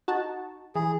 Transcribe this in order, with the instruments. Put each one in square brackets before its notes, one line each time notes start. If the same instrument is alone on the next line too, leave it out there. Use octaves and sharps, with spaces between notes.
[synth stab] D#4 F#4 A5
[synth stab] E3 [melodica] G#4